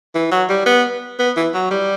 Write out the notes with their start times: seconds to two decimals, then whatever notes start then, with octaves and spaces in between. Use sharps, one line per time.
0.15 E3
0.32 F#3
0.49 G3
0.66 B3
1.19 B3
1.37 E3
1.54 F#3
1.71 G3